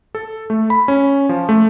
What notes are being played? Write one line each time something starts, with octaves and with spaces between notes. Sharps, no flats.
A4
A3
B5
C#4
F3
A3